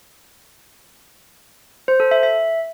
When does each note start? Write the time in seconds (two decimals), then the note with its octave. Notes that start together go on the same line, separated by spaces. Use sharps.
1.88 C5
2.00 A4
2.11 E5
2.23 E5